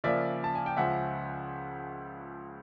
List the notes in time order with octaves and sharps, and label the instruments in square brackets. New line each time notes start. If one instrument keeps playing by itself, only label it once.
[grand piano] C#3 F3 A#3 D5 E5
A5
G#5
G5
C#2 C#3 F3 E5 F#5